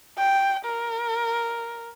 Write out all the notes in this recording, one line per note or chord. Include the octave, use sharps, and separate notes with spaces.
G5
A#4